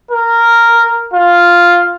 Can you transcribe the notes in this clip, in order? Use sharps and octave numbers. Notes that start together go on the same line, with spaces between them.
A#4
F4